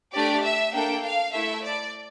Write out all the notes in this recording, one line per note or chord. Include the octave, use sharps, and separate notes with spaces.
A3 D4 G4 D5
E5
A#3 D4 A4 G5
F5
A3 E4 A4 E5
D5